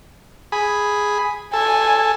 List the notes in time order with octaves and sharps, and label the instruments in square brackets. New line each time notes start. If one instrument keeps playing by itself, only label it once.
[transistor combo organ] G#4 B5
[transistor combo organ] A4 [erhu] G#5